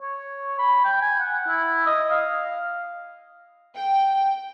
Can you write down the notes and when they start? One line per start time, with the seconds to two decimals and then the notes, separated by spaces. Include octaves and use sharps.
0.01 C#5
0.59 B5
0.84 G5
1.02 G#5
1.19 F#5
1.48 E4
1.86 D#5
2.11 F5
3.75 G5